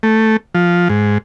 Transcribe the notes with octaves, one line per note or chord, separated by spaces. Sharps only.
A3
F3
G#2